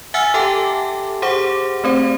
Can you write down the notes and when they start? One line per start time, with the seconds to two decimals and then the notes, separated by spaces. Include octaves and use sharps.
0.14 E5 F#5 G#5 E6 F6 A6
0.34 G4 A4 E5 G5 A5 D6
1.22 G4 G#4 C5 F#5 D6
1.84 A3 C4 C5